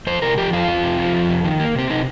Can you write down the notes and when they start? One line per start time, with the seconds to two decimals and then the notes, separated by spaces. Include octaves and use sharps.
0.07 F2 C5
0.22 C3 A#4
0.38 F3 G4
0.53 F2 F4
0.68 F2
0.84 C3
0.98 F3
1.14 F2
1.29 C3
1.44 D#3
1.60 A#3
1.75 C3 C4
1.90 C3 D#4